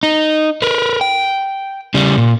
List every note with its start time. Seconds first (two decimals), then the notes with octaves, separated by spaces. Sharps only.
0.03 D#4
0.62 A#4 B4
1.01 G5
1.94 C#3 G3
2.18 A#2